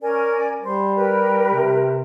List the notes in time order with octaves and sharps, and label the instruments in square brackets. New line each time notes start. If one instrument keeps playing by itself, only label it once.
[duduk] C#4 [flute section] A#4 D5 G#5
[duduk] G3 [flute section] C5
[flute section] G4 A#4 B4
[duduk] C3